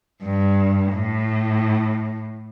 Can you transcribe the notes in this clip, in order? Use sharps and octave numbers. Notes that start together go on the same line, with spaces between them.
G2
A2